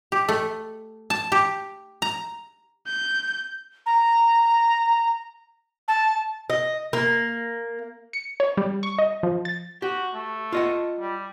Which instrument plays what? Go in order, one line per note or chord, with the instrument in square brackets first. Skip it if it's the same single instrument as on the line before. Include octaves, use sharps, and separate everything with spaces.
[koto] G4
A3
A5
G4
A#5
[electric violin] G6
[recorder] A#5
A5
[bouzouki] D#5
A#3
[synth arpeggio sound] C#7
C#5
G3
C#6
D#5
F3
A6
[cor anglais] F#4 [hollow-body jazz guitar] G4
[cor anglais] A3
[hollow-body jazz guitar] F4 D#5 F#5
[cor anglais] G3